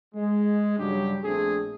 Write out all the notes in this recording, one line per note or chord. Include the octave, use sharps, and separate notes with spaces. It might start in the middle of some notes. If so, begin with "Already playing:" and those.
G#3
G2 C#3 F#3 G3 D4 G4
A#1 A3 C4 D4 G#4